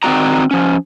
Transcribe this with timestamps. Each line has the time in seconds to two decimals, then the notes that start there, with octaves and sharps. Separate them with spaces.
0.03 D#3 C4 D#4 F#4 D5 A#5
0.51 F3 C#4